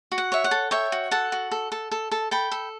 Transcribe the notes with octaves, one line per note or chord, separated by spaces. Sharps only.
F#4
F#5
C#5 E5
F#5
A4
C#5 E5 G5
F#4
A4 F#5 A5
F#4
A4
A4
A4
A4
A4 G5 B5
A4